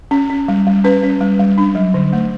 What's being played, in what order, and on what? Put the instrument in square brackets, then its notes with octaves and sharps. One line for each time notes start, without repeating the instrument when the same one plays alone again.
[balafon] C#4
C#4
G3
G3
C#4 B4
C#4
G3
G3
D4
F#3
D3
A3